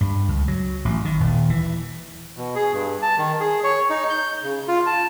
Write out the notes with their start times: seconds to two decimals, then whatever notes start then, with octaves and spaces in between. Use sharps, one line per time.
0.01 G2
0.28 C#2
0.48 F#3
0.85 A1
1.05 D#3
1.20 D#1
1.50 E3
2.37 B2
2.55 G#4
2.73 G2
3.02 A5
3.18 D#3
3.40 G#4
3.63 C#5
3.90 D#4
4.10 G6
4.43 C#3
4.68 F4
4.86 A5